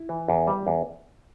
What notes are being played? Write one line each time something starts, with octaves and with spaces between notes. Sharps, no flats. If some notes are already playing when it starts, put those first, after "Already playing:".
Already playing: E4
E3
E2
G3
E2